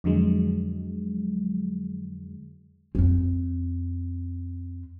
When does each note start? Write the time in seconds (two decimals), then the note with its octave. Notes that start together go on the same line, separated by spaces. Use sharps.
0.04 F2 D3 F#3 G#3
2.95 F2 C4